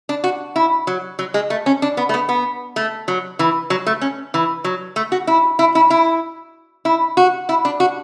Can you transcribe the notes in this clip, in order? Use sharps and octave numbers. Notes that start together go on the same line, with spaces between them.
D4
F#4
E4
F#3
F#3
G#3
A3
C#4
D4
B3
A3
B3
B3
A3
F#3
E3
F#3
A3
C#4
E3
F#3
A3
F#4
E4
E4
E4
E4
E4
F#4
E4
D4
F#4